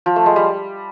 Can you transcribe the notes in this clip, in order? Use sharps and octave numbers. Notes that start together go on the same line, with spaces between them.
F3
A3
G#3
G3